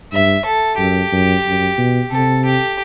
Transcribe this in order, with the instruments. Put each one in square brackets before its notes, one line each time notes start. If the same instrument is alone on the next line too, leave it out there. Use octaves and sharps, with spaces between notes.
[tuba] G2 [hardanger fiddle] E5
[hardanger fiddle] A4
[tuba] F#2 [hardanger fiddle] G4
[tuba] F#2
F#2
B2
[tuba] C3 [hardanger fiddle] A4
[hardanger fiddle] G4